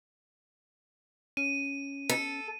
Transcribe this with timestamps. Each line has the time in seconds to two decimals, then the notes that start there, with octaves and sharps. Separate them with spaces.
1.37 C#4 D#7
2.09 A4